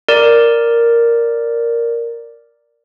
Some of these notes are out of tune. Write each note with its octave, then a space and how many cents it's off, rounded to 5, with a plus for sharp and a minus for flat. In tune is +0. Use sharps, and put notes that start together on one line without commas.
A#4 +0 D5 +0